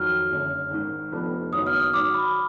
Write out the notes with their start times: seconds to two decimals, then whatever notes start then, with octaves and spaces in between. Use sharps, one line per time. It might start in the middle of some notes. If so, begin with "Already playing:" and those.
Already playing: F2 D#3 F#3 F6
0.30 F#1 F#2 D3
0.70 G#1 G#2 D#3
1.12 F1 F2 F3 B3 D4
1.52 F#1 F#2 D#3 F#3 B3 D#6
1.67 F6
1.80 D#6
1.93 G#1 G#2 F#3 D6
2.14 B5